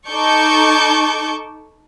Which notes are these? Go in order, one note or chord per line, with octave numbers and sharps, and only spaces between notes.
D#4 A4 A5 C#6 D6 G6